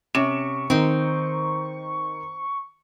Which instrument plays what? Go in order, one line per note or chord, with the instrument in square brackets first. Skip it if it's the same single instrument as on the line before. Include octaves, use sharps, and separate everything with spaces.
[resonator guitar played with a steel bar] C3 [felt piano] C#4 D6 E7 [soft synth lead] C#6
[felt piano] D#3 [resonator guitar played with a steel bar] C4 D#4